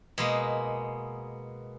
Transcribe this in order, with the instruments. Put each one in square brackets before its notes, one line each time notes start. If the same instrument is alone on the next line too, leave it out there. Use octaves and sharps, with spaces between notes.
[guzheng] B2 G#3 A#3